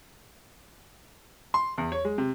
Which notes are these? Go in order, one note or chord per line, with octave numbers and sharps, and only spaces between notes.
C6
E2
C#5
G#3
C3